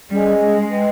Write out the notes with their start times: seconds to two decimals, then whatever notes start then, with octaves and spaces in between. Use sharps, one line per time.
0.10 G3 C#4 G#4 D#5 G#5
0.40 G#3
0.69 B4 D#5 G5